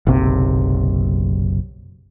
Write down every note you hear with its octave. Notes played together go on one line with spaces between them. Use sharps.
F#1 B1 C3